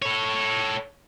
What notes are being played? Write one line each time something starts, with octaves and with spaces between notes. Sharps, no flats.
A4 C#5